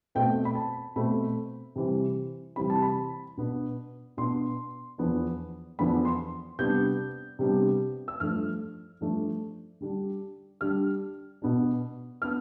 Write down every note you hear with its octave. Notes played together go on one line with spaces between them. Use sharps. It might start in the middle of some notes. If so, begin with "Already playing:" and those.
B2 A3 C4 G5
B5
A5
B2 A3 C4 B5
C3 E3 G3 C4
C3 E3 G3 C4 B5
A5
B5
B2 B3 D4
B2 B3 D4 C6
E2 D3 F3 B3 D4
E2 D3 F3 B3 D4 B5
C6
C3 G3 B3 D4 G6
C3 G3 B3 D4
E6
G2 F3 A3 D4 F6
G2 F3 A3 D4
D3 G3 D4
D3 G3 D4 F6
B2 B3 D4
B3 D4 F6